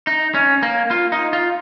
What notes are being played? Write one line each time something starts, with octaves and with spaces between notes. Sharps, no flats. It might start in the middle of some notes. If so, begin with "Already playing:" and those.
D#4
C#4
A#3
F4
D#4
F4